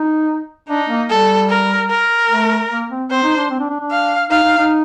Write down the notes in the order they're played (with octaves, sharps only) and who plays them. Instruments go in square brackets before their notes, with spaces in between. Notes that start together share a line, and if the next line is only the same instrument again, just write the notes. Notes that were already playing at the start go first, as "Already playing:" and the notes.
Already playing: [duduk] D#4
[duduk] D4 [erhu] D#4
[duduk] A#3
[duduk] G3 [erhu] A4
[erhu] A#4
A#4
[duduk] A3
A#3
C4
[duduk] C4 [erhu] C5
[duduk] D#4
D4
C4
D4
D4
D4
[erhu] F5
[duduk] D#4 [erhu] F5
[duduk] D#4
D#4